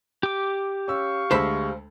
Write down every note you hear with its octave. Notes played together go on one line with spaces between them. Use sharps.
G4 D6
C#4 F5 C#6 E6
D2 G#3 C5 A5 B5 E6